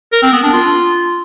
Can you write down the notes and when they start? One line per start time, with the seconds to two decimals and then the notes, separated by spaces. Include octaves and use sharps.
0.12 A#4
0.22 C4
0.33 B3
0.43 D4
0.53 F4